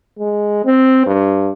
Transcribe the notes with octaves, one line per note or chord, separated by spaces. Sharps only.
G#3
C4
G2